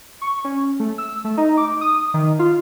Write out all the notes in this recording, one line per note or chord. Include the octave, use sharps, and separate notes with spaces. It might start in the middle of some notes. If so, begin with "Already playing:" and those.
C#6
C#4
A3
E6
A3
D#4
D6
D#6
D#3
F4